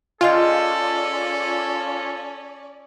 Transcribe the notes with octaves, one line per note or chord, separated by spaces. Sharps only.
C#4 F4 G#4 A4 D5 D#5 G5